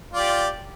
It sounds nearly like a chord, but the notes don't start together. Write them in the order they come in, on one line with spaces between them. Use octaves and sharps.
F4 D5 G4